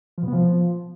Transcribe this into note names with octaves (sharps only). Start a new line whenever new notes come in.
F3
B2
B3
F3